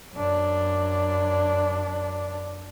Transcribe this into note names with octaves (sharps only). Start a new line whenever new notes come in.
F#2 D4